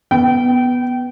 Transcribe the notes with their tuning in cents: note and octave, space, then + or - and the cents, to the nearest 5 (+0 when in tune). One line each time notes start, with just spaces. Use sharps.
B3 +0 B4 +0 G5 -25